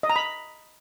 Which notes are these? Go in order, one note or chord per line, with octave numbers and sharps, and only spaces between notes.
D#5
A#5
B5